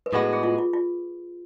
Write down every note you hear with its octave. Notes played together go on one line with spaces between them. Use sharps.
B4
A2 G#3 B3 F#4 A4
A4
G#4
F4
F4
F4